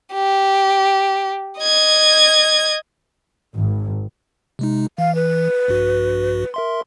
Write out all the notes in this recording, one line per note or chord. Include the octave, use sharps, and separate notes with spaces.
G4
D#5 G#6
G#1
C3 G#3 D#4
E3 F5
B4
A#1 G2 F#4
A#4 E5 C6